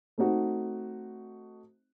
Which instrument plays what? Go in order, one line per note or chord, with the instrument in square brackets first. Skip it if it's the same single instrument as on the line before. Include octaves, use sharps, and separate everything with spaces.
[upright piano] A3 C4 D#4 F#4